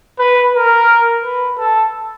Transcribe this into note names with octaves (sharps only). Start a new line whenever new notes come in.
B4
A#4
B4
A4